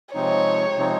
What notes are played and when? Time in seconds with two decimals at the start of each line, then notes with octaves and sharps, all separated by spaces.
0.14 C3 F3 G#3 C4 D#4 C#5
0.77 C3 F3 G#3 C4 D#4